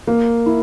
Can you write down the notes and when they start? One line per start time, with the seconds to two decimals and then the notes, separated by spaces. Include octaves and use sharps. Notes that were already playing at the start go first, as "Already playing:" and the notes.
0.07 A#3
0.46 E4